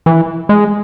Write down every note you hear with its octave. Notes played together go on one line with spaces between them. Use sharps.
E3
G#3